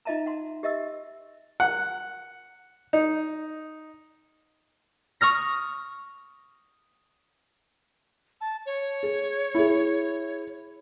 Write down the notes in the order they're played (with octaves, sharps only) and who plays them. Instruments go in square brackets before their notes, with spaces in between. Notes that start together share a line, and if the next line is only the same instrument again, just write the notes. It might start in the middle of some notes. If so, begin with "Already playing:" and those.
[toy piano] D#4 F4 D#5 E5 A5 A#5
F#5 C6
G4 D#5 E5 E6
[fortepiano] F#5
D#4
[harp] C#6 D#6 F6 A#6
[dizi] A5
C#5
[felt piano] G#4
E4 G#4